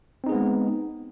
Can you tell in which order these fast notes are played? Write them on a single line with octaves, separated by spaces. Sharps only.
C4 D#4 G#4 B3 G#3